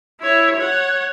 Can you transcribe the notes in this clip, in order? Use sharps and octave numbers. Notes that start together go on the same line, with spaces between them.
E4 C#5
C#5 F#5